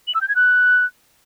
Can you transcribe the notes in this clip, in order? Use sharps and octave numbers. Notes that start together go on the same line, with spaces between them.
F#7
E6
G6
G#6
F#6